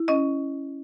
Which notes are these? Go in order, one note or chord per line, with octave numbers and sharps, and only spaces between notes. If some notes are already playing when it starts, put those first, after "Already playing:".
Already playing: E4
C#4 D#5